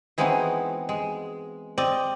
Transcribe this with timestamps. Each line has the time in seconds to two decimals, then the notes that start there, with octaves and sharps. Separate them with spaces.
0.18 E3 G#3 B3 C4 D#4 F#4
0.89 G#3
1.78 C4 D5 D#5